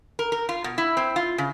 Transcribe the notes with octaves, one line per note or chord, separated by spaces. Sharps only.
A#4
A#4
F4
B2
E4
C4
F4
C#3